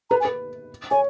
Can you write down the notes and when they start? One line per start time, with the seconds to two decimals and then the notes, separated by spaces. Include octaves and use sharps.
0.10 B4 A#5
0.20 G#5
0.25 B4
0.91 C#5 G#5